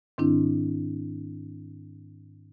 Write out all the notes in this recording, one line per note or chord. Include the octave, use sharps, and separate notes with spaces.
G#2 D#3 C4 D4 E4